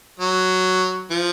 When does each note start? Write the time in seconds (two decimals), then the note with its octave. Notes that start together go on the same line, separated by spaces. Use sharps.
0.20 F#3
1.11 F3